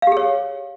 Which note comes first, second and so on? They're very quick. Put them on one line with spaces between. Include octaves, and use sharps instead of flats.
F5 G4 G#4 C#5